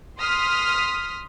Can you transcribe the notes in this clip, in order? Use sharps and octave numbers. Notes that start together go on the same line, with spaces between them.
C6 D#6 F6 B6